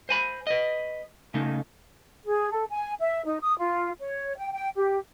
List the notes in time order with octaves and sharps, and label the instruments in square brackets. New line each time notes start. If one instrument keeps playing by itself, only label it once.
[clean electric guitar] C5 G#5 B5
B4 D#5
C#3 A3 D#4
[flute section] G#4
A4
G#5
E5
D#4
D#6
F4
C#5
G5
G5
G4